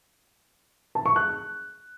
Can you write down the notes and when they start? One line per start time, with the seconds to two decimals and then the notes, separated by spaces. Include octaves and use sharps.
0.95 A5
1.06 C#6
1.16 F#6